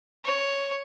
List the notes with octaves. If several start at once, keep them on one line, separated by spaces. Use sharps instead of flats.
C#5